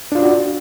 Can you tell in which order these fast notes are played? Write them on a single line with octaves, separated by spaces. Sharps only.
D4 F4 D5 F#4